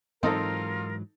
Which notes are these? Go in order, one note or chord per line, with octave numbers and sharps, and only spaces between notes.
G#2 E3 F#3 C4 D#4 F4 A4 A#4